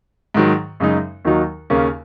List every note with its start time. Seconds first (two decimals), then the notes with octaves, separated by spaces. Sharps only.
0.34 G#2 D#3 F#3
0.80 F#2 C#3 G#3 D#4
1.25 D#2 D#3 F#3 D#4 F#4
1.70 D#2 C#3 A#3 C#4